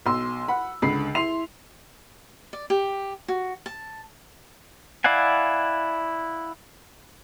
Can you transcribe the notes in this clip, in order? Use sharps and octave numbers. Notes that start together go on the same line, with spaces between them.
B1 C6 E6
F#5 B5
C#2 D3 B5 C7
E4 C6 C7 F7
D5
G4
F#4
A5
E4 D5 F5 F#5 G#5